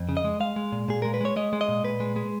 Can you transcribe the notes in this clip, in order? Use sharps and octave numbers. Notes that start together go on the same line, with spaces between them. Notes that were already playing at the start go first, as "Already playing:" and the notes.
Already playing: F2
C#3
D#5
G#3
G#3 F5
G#3
A#2
A#2 G#4
G#3 A#4
B4
G#3 C#5
G#3 D#5
G#3
D#5
A#2
A#2 B4
G#3
G#3